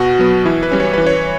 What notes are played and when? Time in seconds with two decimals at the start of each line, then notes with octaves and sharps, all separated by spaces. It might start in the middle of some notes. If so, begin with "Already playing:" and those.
Already playing: B2 F#4
0.19 F#3 B3
0.45 E3 E4
0.63 B4
0.72 G3 C#4
0.80 C#5
0.93 E3 B4
1.07 C#5